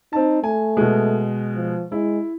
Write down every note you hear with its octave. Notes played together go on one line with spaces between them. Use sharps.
C4 D#4 A5
A3 G#5
B2 G#3
F3
G#3 E4